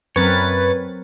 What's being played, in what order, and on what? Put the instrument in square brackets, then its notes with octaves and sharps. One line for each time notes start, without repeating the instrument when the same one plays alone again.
[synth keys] F#2 A6 [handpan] F#3 C4 A#4 [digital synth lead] B4 [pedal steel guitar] C#5